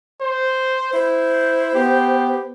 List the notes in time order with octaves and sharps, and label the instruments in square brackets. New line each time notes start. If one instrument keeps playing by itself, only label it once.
[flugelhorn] C5
[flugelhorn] E4 [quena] C5
[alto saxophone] B3 [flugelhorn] G4